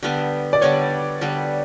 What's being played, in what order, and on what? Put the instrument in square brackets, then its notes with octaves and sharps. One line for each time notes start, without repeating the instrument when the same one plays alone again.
[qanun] D3 G3 B3
[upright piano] D5
[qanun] D3 G3 B3 [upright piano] C#5
[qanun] D3 G3 B3